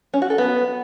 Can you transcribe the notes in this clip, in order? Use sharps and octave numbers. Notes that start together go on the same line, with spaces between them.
C#4
F#4
A4
B3